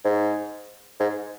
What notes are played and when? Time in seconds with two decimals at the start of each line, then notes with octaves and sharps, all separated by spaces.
0.05 G#2
1.00 G#2